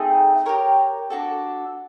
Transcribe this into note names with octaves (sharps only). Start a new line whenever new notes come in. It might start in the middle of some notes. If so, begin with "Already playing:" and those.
Already playing: A3 C4 D#4 G#4
G4 A#4 C#5
D4 F#4 A4